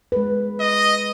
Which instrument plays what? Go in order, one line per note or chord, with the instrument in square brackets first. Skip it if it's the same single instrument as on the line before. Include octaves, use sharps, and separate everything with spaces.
[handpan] G#3 B4
[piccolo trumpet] D#5